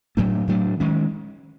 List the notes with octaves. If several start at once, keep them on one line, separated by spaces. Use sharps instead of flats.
A2 F#3 A3 D4
A2 F#3 A3 D4
D#3 G#3 C#4